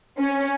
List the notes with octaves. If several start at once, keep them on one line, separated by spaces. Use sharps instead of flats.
C#4